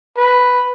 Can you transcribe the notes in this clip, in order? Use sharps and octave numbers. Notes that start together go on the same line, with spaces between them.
B4